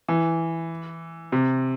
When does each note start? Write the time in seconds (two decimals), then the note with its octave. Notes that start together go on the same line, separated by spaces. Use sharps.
0.09 E3
1.32 C3